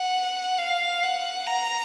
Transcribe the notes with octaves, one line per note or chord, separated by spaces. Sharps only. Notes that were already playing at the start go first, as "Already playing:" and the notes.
Already playing: F#5
F5
F#5
A#5